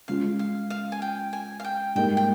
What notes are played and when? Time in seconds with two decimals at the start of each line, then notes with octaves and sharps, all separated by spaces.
0.08 C#3 G#3 C#4 F4 F5
0.39 F5
0.70 F5
0.92 G#5
1.02 G5
1.33 G#5
1.60 F5
1.64 G5
1.95 G#2 G3 A#3 D#4 G5
2.17 G5